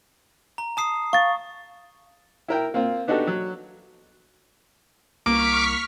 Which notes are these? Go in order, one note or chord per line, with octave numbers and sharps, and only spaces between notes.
A#5
A5 D#6 C7
F5 C#6 A6
E4 A#4 G5
A#3 C4 F4
B3 D4 D#4 F#4 G4 A4
F#3
C2 A#3 C#6 D6 F6 B6